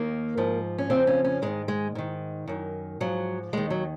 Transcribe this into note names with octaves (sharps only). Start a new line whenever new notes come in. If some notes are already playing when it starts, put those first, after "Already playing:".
Already playing: D#2 D#3 A#3
G#2 F3
C#4
F2 C#3 F3 C4
C#4
C#4
G#2 D#3 G#3
G#3
G#2 D#3
F#2 D#3
G#2 F3 F#3
D#2 D#3 G#3
F#3